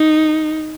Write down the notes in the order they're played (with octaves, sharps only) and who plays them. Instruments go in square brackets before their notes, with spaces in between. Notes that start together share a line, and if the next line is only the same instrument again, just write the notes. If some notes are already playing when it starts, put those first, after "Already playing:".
Already playing: [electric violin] D#4